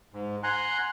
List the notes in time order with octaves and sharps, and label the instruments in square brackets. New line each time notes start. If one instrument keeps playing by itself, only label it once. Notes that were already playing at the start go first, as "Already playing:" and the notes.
[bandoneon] G#2
F#5 G#5 A#5 C6 F#6